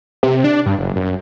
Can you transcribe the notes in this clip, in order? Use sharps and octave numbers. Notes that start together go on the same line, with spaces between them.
C3
D4
G2
F#1
F#2